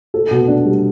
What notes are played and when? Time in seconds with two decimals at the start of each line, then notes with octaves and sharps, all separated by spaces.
0.14 A4
0.31 B2
0.48 D4
0.65 G3